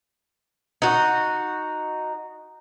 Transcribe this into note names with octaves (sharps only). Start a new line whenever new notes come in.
D#4 F#4